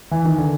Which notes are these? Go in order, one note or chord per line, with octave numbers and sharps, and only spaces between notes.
E3
D#3
D3